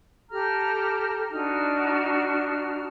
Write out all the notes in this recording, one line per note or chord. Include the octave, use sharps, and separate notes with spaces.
G4 A4 A#5 F6
D4 D#4 F#4 F6